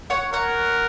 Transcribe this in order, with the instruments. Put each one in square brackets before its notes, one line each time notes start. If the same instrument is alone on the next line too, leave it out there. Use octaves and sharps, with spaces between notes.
[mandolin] C#5 F#5
[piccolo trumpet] A#4 [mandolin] C#5 F#5